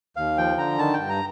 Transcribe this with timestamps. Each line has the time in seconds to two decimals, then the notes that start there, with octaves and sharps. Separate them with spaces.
0.16 D#2 F5
0.38 F3 G5
0.57 D3 A#5
0.79 D#3 A5
0.93 G2 G5
1.09 A#5